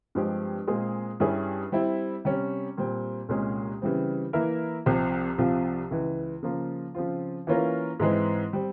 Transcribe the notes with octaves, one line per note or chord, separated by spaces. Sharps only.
G2 F3 G#3 C4 G4
A#2 G#3 C4 F4 G#4
G2 G3 C#4 E4 G#4
G3 C4 E4
C3 G3 C#4
A#2 G3 C4
C2 A#2 G#3 C#4
C#3 E3 G3 C4
E3 A#3 E4 A#4 E5
C2 C3 F3
C2 C3 F3 C4 F4
C#2 C#3 E3
C#3 F3 A#3 F4
C#3 F3 C4 F4
E3 A#3 C#4 F4 A#4
G#2 E3 G#3 C4
G3 C4